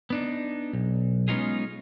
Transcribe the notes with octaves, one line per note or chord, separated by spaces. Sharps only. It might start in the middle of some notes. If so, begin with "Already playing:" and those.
B3 D4 D#4
B1
G#3 B3 C#4 D#4 F4 G#4